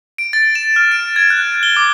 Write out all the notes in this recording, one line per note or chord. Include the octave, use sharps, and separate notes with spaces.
D7
A6
E7
F6
D7
G#6
F#6
G7
D6